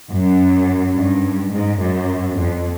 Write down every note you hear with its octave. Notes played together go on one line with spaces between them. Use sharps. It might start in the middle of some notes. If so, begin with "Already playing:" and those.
F#2
G2
G#2
F#2
F2